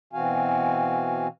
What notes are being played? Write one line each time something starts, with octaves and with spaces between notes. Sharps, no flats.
B2 E3 C4 F#4 F5 G#5